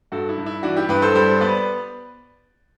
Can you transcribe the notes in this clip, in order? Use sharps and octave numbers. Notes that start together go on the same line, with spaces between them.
G2 F#4 A4
E4
G2
E4
E3 D4 F#4
E4 G4
G2 G4 B4
A4 C5
G3 A4 C5
B3 B4 D5